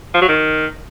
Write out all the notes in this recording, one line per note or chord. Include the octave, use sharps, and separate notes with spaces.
F3
F#3
D#3